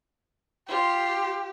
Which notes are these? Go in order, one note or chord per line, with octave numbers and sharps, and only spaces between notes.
F4 G4 C6